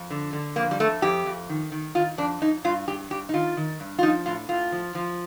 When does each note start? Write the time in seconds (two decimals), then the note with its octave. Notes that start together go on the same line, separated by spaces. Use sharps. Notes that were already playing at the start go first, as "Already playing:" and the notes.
Already playing: F2
0.10 D3
0.33 D3
0.56 F2 A#3
0.71 G3
0.80 F2 A3
1.02 F2 G4
1.26 F2
1.49 D#3
1.72 D#3
1.95 D#3 F4
2.18 F2 D4
2.41 F2 D#4
2.64 G2 F4
2.88 G2 G4
3.10 G2 G4
3.29 D#4
3.34 D#3 F4
3.57 D#3
3.80 G2
3.99 F4
4.02 F3 D#4
4.26 A2 F4
4.49 A2 F4
4.72 F3
4.95 F3